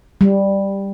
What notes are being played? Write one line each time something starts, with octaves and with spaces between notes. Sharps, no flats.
G3